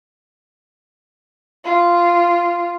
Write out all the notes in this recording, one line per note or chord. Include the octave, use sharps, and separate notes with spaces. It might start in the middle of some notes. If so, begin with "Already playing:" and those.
F4